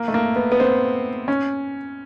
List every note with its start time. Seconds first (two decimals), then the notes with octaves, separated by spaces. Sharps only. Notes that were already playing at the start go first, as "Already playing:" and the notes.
Already playing: A#3
0.08 A3
0.14 A#3
0.36 B3
0.52 B3
0.60 C4
1.28 C#4